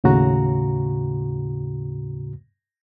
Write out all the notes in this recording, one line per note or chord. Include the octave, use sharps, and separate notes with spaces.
D#2 A2 C#3 F#4 A#5